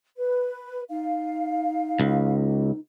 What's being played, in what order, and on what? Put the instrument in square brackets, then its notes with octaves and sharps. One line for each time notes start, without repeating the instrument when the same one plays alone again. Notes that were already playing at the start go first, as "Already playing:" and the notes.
[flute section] B4
[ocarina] D#4 [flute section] F5
[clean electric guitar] C#2